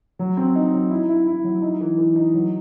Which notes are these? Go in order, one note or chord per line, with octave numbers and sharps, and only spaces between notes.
F#3
C4
D#4
F#3
E4
E4
E4
F#3
D#4
E3
E3
D#4
F#3